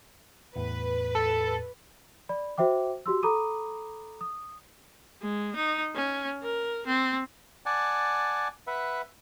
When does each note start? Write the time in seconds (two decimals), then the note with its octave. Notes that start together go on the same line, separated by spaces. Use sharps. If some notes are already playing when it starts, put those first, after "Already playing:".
0.56 E2 A2 B4
1.15 A4
2.29 D5 B5
2.58 F#4 C5 E5 G5 D6
3.06 F#4 G4 C6 E6
3.23 A4 A#5 B5 D6 D#6 D#7
4.21 D#6
5.22 G#3
5.55 D#4
5.95 C#4
6.42 A#4
6.86 C4
7.66 D5 F#5 G#5 A5
8.67 B4 E5 F#5